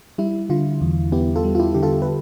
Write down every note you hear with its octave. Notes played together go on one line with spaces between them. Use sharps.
G3 E4
D3 F4
E2
B3 E4 G4
F4 A4
G3
F4
E4 G4
D3 G4
F4 A4
B4